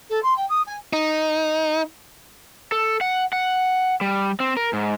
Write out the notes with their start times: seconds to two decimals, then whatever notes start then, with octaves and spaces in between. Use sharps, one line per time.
0.09 A4
0.23 C6
0.36 G5
0.49 D#6
0.66 G#5
0.93 D#4
2.72 A4
3.01 F#5
3.33 F#5
4.01 G3
4.40 C4
4.57 A#4
4.73 G#2